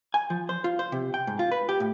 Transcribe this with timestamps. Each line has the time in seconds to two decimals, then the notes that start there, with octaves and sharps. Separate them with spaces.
0.14 G#5
0.30 F3
0.49 C5
0.64 F4
0.79 C5
0.92 C3
1.14 G5
1.27 G#2
1.39 F4
1.52 B4
1.69 G4
1.80 A2